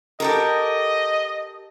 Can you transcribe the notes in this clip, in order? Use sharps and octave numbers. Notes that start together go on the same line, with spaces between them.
G4 A4 A#4 D#5